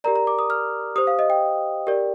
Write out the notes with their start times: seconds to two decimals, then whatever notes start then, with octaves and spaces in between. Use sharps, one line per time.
0.04 G4 A#4 D5 A#5
0.16 A#5
0.27 D6
0.39 D#6
0.50 F6
0.96 G4 C5 D#6
1.07 F5
1.19 D#5
1.30 G5
1.87 G4 A#4 D5